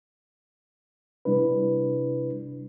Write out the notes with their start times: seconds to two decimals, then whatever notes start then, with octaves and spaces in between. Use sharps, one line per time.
1.25 C3 G3 D4 E4 B4